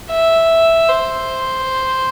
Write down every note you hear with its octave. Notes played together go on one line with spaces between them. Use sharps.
E5
C5